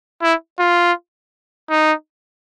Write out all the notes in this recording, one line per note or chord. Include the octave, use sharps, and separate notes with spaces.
E4
F4
D#4